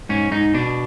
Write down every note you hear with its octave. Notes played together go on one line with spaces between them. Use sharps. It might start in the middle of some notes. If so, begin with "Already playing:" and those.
G#2 C#4
G#2 D#4
B2 D4